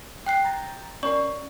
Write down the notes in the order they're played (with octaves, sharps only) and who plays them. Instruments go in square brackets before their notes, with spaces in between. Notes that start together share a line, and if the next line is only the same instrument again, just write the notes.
[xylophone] G5 F#6 C7
[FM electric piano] A#5 G6 A6
[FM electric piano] C#4 A#4 C7 [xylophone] D5 C#6